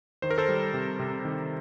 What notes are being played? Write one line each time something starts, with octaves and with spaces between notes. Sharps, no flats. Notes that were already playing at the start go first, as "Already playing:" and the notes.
D#3 C5
A#4
A4 C5
G3
C3
C3
D#3